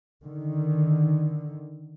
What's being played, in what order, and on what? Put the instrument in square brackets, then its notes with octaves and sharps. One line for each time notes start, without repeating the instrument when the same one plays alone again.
[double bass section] D3 D#3